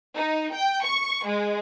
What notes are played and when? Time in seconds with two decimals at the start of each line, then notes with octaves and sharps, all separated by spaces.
0.15 D#4
0.53 G5
0.85 C#6
1.25 G#3